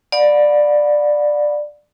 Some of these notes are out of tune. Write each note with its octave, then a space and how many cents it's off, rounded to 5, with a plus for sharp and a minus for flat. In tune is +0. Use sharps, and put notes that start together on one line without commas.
D5 +10 F#5 -40 B5 +0